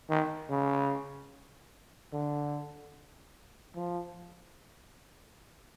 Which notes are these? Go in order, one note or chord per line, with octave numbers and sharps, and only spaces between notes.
D#3
C#3
D3
F3